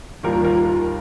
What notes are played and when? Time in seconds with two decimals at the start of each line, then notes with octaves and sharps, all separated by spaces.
0.23 D#2 D#3 G3 F4 A#4
0.44 F4 A#4
0.65 F4 A#4